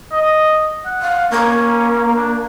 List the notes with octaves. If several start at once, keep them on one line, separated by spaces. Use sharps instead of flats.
D#5
F#5
F5
A#3 C#4
D4